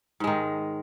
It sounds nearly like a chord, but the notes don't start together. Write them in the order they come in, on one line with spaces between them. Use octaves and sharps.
G#2 G#3 D#3